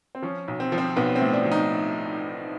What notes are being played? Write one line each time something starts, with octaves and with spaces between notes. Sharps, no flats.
C4
F3 C#4
B1
C4
F3
C4
B1 B3
C4
A2
D4
F3
D#4